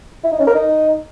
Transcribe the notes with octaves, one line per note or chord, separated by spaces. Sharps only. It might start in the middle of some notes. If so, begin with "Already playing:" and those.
E4
D#4
C#4
A#4
D#4